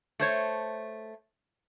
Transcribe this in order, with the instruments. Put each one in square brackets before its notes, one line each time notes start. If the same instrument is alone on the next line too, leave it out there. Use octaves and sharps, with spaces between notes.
[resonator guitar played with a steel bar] A3 C5 C#5